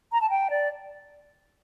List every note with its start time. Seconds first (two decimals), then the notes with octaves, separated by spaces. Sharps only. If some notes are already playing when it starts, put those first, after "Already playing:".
0.12 A#5
0.21 A5
0.30 G5
0.50 D5